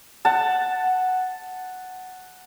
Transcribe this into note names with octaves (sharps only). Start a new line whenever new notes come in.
F#5 A5